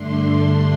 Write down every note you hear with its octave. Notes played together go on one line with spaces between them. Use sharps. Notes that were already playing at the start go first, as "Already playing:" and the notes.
Already playing: G2 D3 A3 D4 C6